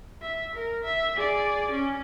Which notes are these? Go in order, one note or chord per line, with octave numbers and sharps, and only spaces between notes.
E5
A#4
E5
G#4 D5
C#4